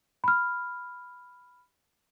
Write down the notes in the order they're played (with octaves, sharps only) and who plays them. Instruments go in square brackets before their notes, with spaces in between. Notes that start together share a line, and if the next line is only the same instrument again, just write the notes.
[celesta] B5 F6